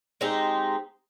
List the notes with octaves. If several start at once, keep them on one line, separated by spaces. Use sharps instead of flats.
G#3 C4 D#4 G4